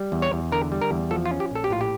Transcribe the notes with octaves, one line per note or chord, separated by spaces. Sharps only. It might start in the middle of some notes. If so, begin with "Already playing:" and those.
Already playing: G3
E2
C#5
E2
D3 A#4
G3
A#4
E2
F3 A4
F4
C#4
G4
A#1 A4
G4
A2 F4
G4